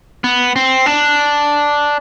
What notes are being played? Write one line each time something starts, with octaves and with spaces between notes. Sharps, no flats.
B3
C4
D4